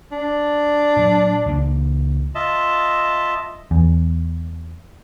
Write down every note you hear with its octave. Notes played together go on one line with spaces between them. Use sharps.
D4
A#2 F#3
C#2 A#3
F4 D#5 E5 A5
E2